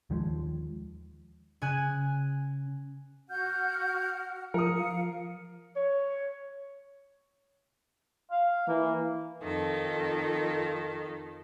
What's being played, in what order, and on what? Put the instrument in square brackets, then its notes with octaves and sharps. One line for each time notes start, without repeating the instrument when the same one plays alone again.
[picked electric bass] D#2 D#3 F3 G#3
[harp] C#3 G#5 F#6
[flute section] F#4 F#5 F6 [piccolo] G6
[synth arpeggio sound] F3 [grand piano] A#4 D#6 [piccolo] C#7
[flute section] F5
[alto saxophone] C#5
[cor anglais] F5
[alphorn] E3 [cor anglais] A#3
[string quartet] F2 D#3 A4